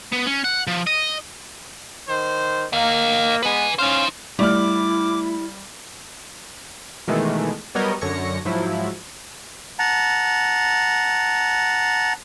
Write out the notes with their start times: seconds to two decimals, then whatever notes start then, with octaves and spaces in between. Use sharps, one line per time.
0.12 B3
0.26 C#4
0.44 F#5
0.67 F3
0.87 D#5
2.09 D#3 C5
2.73 A#3 D#5 F5
3.43 G#3 B3 B4 G#5
3.79 C#4 D#4 C5 F5
4.39 G3 A3 E4 D5 D6 F6
7.07 B2 D#3 E3 G#3 A3
7.75 F#3 G3 B3 A#4 C#5 D#5
8.01 F#2 D3 C#5 A#6 C#7
8.45 G#2 F3 F#3 E4
9.79 F#5 A5 A#5